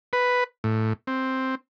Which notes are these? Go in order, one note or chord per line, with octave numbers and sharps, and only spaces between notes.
B4
A2
C4